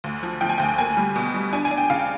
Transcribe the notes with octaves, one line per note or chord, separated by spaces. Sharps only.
D2
F3
F3 G5
G#5
D2 G5
A#3 G#5
G3
B2
G3
D4 G#5
G#5
D4
G5
C#3 F5